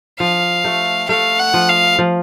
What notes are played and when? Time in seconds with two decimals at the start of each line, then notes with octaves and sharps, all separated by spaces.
0.20 F3 F5
0.64 A3
1.09 A3 F5
1.39 F#5
1.54 F3
1.69 F5
1.99 F3